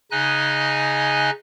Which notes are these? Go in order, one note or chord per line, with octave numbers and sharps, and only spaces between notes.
C#3 D#4 D#5 G#5 F#6